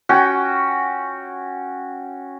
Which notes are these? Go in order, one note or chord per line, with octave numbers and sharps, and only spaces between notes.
C#4 F#4 G5